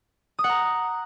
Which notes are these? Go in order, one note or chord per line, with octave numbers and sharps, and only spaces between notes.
D#6
F#5
A#5